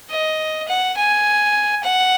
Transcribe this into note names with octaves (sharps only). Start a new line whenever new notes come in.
D#5
F#5
G#5
F#5